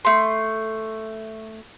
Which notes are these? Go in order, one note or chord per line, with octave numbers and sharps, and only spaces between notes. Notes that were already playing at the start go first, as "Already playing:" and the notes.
A3 C6